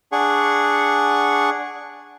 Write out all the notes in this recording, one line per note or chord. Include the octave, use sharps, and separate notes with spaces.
D4 G#4 F#5 C#6